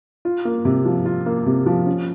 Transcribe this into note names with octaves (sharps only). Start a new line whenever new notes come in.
F4
A#3
C3
F3
F4
A#3
C3
F3
C#4